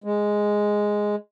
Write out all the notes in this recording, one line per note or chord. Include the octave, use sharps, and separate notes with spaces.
G#3